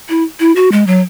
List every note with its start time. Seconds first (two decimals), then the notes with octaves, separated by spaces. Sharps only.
0.09 E4
0.40 E4
0.56 F#4
0.72 G#3
0.87 F#3